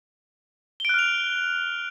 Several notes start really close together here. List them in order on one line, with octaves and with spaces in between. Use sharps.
G7 D7 F#6 F6 F7